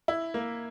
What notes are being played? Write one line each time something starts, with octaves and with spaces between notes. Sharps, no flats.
E4
A#3